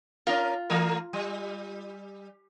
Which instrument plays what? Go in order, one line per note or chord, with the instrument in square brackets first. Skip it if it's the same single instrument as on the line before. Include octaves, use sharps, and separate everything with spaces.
[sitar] C#4 A#4 [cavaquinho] F4
[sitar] E3 A3 A#4
G3